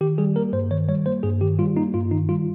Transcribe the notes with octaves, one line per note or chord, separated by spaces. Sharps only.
D#3 G4
G3 G#4
A#3 A#4
G2 C5
D#3 C#5
G3 C#5
A#3 C5
G2 G#4
D#3 G4
G3 F4
A#3 D#4
G2 F4
D#3 D#4
G3 F4